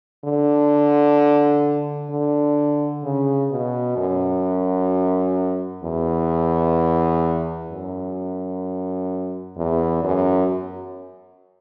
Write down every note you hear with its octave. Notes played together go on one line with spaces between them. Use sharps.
D3
D3
C#3
B2
F#2
E2
F#2
E2
F#2